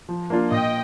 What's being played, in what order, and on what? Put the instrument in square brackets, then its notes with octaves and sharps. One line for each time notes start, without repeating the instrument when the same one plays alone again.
[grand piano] F3
A#3 D4 F4
[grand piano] A#2 [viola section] D#5 G5